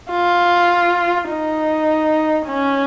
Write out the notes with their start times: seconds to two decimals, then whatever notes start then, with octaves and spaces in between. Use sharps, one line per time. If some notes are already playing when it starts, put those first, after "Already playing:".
0.11 F4
1.30 D#4
2.48 C#4